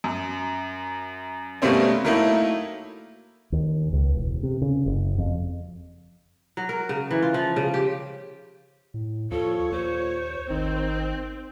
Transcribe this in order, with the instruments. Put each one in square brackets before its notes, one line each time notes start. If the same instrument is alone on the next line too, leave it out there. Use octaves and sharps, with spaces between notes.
[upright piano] F#2
B2 G3 A3 A#3 C4 C#4
F#3 A3 A#3 D#4 E4
[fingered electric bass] D#2
C#2
E1
C3
C#3
F#1
F2
[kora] F#3
A#4
C#3
E3
F4
F3
C#3
G4
[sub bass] A2
[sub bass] D#2 [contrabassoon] F3 [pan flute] A4 [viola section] C#5
[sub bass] D#2 [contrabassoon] A#2 [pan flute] C5
[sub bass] G#1 [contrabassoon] D#3 [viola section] C4